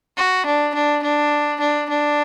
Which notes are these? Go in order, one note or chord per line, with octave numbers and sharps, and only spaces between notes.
F#4
D4
D4
D4
D4
D4